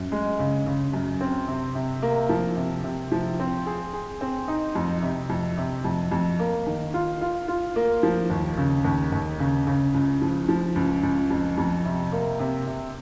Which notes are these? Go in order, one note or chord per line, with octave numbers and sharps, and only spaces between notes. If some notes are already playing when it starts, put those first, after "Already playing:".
Already playing: F#2
G#3
C#3
C#3
F#2
C4
C3
C3
A#3
F3
C3
C3
F3
C4
G#4
G#4
C4
D#4
F2
C3
F2
C3
F2
F2
A#3
D#3
F4
F4
F4
A#3
F3
D#2
C#3
D#2
D#2
C#3
C#3
C#2
F3
F3
C#2
C#2
F2
F2
C3
A#3
C3
C3